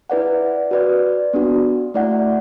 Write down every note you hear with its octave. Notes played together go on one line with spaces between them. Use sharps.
E4 B4 D5 F#5
F#4 B4 D5
B3 D4 F#4
A3 E4 D5 F#5